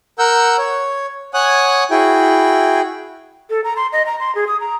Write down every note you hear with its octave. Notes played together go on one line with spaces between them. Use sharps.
A#4 F#5 E6 G6
C#5
C#5 F#5 G#5 D#6 F#6
E4 F#4 G#4 G5
A4
A#5
C6
D#5
A#5
C6
G#4
D#6
A#5